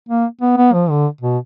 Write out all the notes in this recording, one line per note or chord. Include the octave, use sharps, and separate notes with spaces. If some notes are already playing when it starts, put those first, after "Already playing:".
A#3
B3
B3
F3
D3
B2